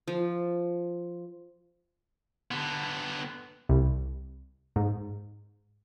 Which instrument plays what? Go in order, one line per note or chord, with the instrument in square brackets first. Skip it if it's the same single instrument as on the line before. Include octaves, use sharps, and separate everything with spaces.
[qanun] F3
[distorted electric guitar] D3 B3
[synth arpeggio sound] C2
G#2